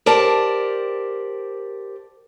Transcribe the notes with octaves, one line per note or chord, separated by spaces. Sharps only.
G4 A#4 C5 D5 A5